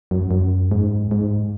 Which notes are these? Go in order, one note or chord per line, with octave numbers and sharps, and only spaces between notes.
F#2
F#2
G#2
G#2